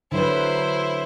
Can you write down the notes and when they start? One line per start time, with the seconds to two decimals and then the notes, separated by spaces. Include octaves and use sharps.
0.12 D3 F#3 E4 B4 C5